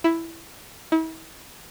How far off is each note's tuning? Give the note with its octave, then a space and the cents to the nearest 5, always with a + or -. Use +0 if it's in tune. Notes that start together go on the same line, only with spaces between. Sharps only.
E4 +5
E4 -40